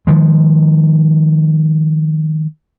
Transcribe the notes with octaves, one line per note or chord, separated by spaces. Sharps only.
D#3 F3 G#3